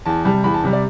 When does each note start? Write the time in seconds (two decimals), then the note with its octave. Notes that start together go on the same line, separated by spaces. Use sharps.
0.06 E2 A5
0.25 C3 G3 A5
0.44 E2 B5
0.54 A5
0.64 C3 G3
0.73 D5